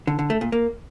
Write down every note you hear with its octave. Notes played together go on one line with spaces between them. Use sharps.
D3
D3
A3
A#2
A#3